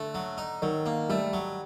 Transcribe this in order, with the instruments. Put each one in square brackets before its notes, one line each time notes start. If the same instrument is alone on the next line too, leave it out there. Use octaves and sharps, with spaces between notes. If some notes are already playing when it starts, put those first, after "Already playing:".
Already playing: [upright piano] D3 [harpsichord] A3
[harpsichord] F#3
D#4
[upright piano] D#3 [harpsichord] F#3
[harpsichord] A#3
[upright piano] G3 [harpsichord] A3
[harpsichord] F#3